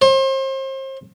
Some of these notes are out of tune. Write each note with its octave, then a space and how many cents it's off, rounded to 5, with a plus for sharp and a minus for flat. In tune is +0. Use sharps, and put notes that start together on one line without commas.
C5 +35